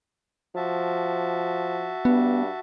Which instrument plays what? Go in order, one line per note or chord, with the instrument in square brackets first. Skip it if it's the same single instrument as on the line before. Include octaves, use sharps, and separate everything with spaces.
[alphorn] F3 [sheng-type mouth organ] F#4 E5 A5
[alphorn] G2 [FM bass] B3